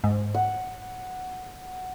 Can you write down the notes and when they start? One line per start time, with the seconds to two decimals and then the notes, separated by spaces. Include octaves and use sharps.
0.04 G#2
0.34 F#5